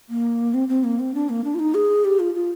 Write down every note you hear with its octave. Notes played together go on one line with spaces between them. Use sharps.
A#3
C4
C4
A#3
C4
D4
A#3
D4
F4
D#4
G#4
G4
F4
F4